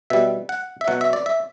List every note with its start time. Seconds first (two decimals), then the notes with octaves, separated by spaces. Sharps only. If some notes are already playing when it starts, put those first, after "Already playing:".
0.10 B2 G3 E5
0.49 F#5
0.81 E5
0.87 B2 F#3 F#5
1.01 E5
1.13 D5
1.26 E5